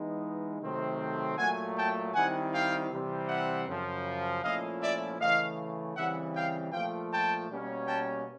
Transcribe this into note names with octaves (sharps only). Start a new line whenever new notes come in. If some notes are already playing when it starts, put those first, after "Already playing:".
Already playing: E3 G#3 B3 D#4
C3 D#3 F#3 A3 C4
A#2 F#3 A3 F#5 G#5
G5 A5
D#3 G3 C4 E4 F#5 G#5
F5 G5
C3 E3 G3 C4
E5 F#5
F#2 C#3 F3
A#2 F3 A3 C#4 E4 D#5 F5
D5 E5
C#3 E3 A3 D#5 F5
C#3 E3 G3 C4 E5 F#5
F5 G5
A#2 F3 A3 F5 G5
G5 A5
B2 G3 A#3 C#4
G5 A5